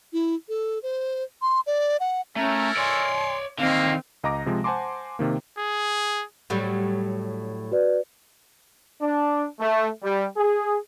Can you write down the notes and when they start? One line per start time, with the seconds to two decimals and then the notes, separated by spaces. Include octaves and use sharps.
0.13 E4
0.49 A4
0.83 C5
1.42 C6
1.67 D5
2.00 F#5
2.36 A3 C#4 E4 A4 A#4 A#5
2.77 C#5 D5 G#5 C6
3.58 D3 D#3 G#3 A#3 C4 F5
4.24 C#2 D#5 A#5 D6 A#6
4.46 C3 F3 G#3
4.64 C5 F#5 G#5 A5 C6 D6
5.19 C3 D#3 A#3
5.59 G#4
6.50 A2 F#3 G3
7.71 F#4 B4 D5
9.02 D4
9.60 A3
10.03 G3
10.37 G#4